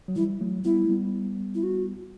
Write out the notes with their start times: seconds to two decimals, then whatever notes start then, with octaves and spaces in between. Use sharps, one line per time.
0.08 F#3
0.16 E3 G3 E4
0.41 F#3 A3
0.64 G3 B3 E4
0.84 A3
0.90 G3 B3
1.55 E4
1.63 F#4